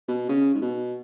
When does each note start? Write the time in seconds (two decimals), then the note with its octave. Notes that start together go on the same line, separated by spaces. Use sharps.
0.08 B2
0.29 C#3
0.55 G#2
0.61 B2